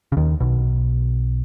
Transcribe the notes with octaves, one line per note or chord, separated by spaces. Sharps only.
C#3
D#2 D#3
B1 B2